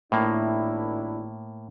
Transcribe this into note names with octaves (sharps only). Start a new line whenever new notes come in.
G#1 A2 A#3 D4 E4